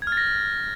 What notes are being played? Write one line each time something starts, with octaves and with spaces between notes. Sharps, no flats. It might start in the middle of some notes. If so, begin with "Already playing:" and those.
G#6
F6
A6
A#6